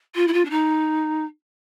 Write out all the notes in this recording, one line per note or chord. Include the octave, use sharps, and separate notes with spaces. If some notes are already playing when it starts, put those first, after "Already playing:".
F4
E4
F4
D4
D#4